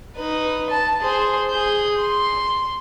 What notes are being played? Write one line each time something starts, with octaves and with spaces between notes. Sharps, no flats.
D#4 B4
A5
G#4 C5
G#4 G6
C6